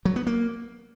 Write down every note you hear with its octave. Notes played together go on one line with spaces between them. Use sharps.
F#3
B3
A#3